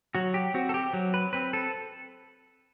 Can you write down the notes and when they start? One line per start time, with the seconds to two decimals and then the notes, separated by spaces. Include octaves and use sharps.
0.15 F#3 F#4
0.34 G4
0.54 C4 F#4
0.69 A4
0.74 G4
0.93 F#3
1.14 B4
1.33 C4 B4
1.53 A4